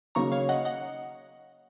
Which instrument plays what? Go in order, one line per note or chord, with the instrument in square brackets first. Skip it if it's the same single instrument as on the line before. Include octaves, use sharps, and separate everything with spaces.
[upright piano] C#3 F#3 A#3 D#4 [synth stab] A#5 C#6
[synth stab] C#5 F5
D#5 F#5
D#5 F#5